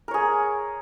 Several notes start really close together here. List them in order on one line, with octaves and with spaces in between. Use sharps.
A#4 C#5 G#4